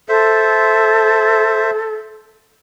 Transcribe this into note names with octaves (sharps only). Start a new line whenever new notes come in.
A4 C5 E5